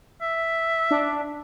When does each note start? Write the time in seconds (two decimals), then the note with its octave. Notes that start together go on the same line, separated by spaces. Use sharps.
0.21 E5
0.91 D4